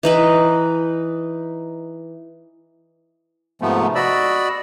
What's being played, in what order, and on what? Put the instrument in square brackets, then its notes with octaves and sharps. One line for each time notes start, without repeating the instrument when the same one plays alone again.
[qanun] E3 D#4 B4
[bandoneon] G#2 C3 F3 A3 B3
F#4 D5 D#5 B5 E6